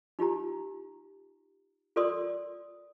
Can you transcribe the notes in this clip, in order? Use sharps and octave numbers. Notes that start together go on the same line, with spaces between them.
D#4 F4 G4 A#5
F4 A4 A#4 D5 C6 D#6